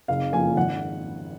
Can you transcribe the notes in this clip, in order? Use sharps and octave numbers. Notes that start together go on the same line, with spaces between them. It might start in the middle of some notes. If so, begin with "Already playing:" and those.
F#1 F5
F2 F3 A#3 G#5
G#1 F#5